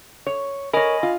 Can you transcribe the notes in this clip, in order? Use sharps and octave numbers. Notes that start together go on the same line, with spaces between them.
C#5
A#4 C#5 D#5 G#5 B5
F4